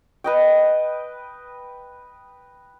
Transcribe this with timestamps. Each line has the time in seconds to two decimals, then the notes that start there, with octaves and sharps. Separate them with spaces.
0.24 B4 D#5 G5